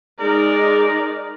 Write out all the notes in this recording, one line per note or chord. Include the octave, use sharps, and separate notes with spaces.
G#3 D#4 G#4 A#4 D5